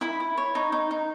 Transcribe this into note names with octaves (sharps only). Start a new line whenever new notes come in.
E4 B5
E4
C#5
D#4
D#4
D#4